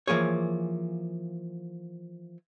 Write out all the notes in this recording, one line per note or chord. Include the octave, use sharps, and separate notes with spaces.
E3 F3 A#3 G#4 C#5